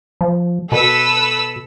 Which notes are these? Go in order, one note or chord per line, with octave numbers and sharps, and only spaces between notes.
F3
B2 A4 B4 E6